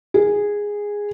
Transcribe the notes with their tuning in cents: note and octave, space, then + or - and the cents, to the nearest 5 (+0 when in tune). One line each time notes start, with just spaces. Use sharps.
G#4 -10